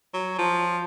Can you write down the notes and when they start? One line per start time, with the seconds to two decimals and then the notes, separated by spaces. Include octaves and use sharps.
0.14 F#3
0.38 F3